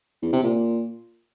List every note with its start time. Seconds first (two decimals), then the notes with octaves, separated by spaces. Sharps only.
0.22 E2
0.33 C3
0.43 A#2